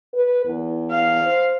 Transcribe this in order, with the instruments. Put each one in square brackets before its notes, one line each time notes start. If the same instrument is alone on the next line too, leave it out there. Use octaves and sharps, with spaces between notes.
[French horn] B4
E2
[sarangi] F5
[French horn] C5